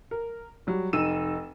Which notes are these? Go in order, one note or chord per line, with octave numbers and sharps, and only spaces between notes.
A#4
F#3 G3
F1 D#4 E6 D#7 E7